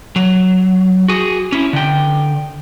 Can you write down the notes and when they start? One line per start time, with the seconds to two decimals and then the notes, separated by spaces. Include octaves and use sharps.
0.16 F#3
1.08 F#4 G#4
1.52 C#4 E4
1.73 D3 G5